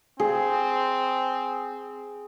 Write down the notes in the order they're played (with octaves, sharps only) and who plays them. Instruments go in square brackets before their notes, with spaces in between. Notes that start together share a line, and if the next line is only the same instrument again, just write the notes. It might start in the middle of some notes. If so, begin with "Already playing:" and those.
[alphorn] C4 [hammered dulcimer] G#4